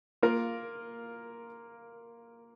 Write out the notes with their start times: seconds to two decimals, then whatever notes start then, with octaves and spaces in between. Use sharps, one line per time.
0.23 A#3 F4 A#4